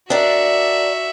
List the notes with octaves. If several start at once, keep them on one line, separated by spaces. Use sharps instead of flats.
D4 F#4 A#4 D5 E5